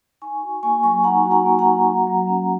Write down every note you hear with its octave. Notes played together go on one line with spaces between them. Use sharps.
D#4 G#5 C#6
F#4
A#3 G#5 C#6
F#3 G#5 C#6
D#4 F#5 A#5
F#4
F#5 A#5
A#3
F#5 A#5
F#3
F#4
F#3
C#4